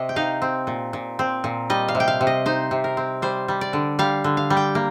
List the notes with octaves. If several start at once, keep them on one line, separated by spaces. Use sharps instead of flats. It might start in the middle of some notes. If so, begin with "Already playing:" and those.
Already playing: C3 D#5
G5
D#4 F5
C4
A#2
A#2
C4
A#2
G3 D#5
F5
C3
G5
F5
C3
D#5
D#4 C5
C3
A#4
C4
G3 C5
G3
D5
D3
G3 F5
D3
F5
G3
G5
A#3